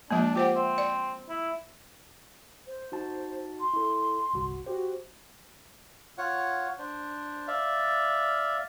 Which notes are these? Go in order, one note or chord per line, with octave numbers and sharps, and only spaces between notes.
F3 G#3 A#3 D4
F4 G4 C5 F#5
C4 E5
D5
E4
C5
D#4 F#4 A5
C6
E4 A4
G1 C2 F#4
F#4 G4 C5
F4 C#5 F#5
D4 C5
D5 E5 F5